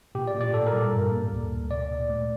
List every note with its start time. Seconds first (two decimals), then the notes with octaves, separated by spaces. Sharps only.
0.15 A#2 G4
0.27 D5
0.34 A#2
0.41 D5
0.53 A2 A4
0.67 A#4
0.73 G3
0.93 G2
1.12 A#3
1.31 D2
1.51 D2
1.70 A#2 D5
1.90 A#2
2.10 A3